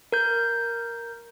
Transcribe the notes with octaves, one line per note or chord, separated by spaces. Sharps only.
A#4 G6